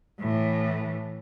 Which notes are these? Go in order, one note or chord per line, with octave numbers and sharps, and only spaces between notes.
A2 E3